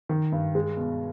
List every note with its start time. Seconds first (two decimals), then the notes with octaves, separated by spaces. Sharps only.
0.09 D#3
0.32 G2
0.55 G#3
0.77 B2